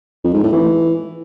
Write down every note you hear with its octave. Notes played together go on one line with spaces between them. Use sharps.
F2
G#2
A2
E3